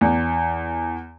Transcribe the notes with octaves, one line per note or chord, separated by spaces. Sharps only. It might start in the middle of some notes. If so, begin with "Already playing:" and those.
E2